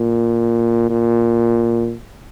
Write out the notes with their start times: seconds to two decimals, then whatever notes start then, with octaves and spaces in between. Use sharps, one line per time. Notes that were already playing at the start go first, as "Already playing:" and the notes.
Already playing: A#2
0.90 A#2